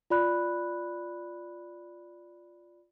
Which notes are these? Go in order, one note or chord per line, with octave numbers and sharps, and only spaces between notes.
F4 D5 B5 F#6